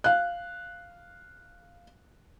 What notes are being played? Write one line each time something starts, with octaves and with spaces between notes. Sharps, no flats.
F5 F#6